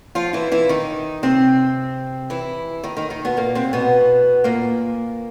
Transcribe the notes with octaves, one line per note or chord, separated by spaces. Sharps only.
F3 F4
E3 E4
E3 E4
D#3 D#4
C3 C4
E3 E4
D#3 D#4
D#3 D#4
D#3 D#4
B2 B3
A#2 A#3
C3 C4
B2 B3
A#2 A#3